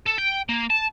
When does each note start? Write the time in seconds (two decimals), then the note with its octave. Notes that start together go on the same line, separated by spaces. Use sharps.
0.06 A4
0.18 G5
0.49 A#3
0.70 A5